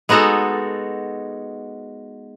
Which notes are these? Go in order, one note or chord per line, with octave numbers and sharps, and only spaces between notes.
G#3 B3 D#4 F#4 A4